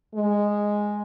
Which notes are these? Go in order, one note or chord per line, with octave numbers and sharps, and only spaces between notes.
G#3